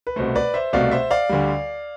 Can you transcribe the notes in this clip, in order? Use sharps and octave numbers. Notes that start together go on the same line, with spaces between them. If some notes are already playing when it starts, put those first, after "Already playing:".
B4
C2 B2 A3 C5
B4 D5
C5 E5
C2 B2 A3 D5 F5
C5 E5
D5 F5
D2 D3 G3